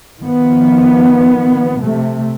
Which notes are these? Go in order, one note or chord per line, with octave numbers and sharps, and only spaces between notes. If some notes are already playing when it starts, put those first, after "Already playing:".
D#3 F3 B3
C3 A3